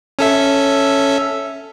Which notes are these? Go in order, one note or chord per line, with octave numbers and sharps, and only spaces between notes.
C#4 A4 E5